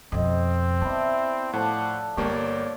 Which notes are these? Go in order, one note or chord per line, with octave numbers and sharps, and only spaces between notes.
F2 B2 C4 D#5
B3 D4 E4
A2 F3 A4 D5 F#5
G1 G#3 A#3 G4 C#5 D5 C#6 D6